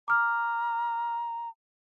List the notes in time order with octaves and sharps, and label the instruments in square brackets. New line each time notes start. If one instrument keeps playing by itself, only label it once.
[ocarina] A#5 [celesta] D6 F6